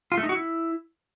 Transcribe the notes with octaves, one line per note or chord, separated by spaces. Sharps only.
F4
A3
D#4
F#4
E4